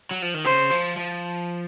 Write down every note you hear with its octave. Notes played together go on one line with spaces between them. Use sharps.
F#3
F3
D#3
C#3 C5
F3
F3